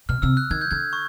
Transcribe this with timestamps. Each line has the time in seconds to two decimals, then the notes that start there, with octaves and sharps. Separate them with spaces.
0.09 B2 F6
0.22 C3 E6
0.37 F#6
0.50 D#3 G#6
0.61 G6
0.71 D3 G#6
0.93 C#6